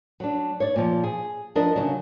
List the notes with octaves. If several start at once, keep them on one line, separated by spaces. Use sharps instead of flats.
F#3 D4
C#5 D5
A#2 F3
G#4
F3 D4 A#4 D#5
C#3 F#3